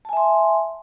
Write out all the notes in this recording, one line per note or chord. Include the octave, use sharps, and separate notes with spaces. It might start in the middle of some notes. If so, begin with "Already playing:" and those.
E5 G#5 A5 C6